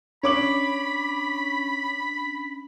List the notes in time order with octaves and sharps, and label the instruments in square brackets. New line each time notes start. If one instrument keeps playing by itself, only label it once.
[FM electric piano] C#4 D4 [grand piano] C#5 D6 F#7 [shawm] B5